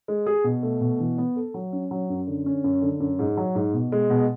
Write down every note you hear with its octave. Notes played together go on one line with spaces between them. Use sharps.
G#3
G#4
B2
A3
B2
E3
B3
A4
F#3
C#4
F#3
F#2
D3
C#4
F#2
D3
F#2
G#2
F#3
G#2
B2
G#3
B2